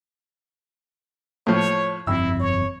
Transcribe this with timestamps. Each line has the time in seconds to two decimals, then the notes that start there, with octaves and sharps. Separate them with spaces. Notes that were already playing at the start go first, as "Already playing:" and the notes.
1.47 A2 F3 C#5
2.07 G1 F2 C4 E4 E6
2.40 C#5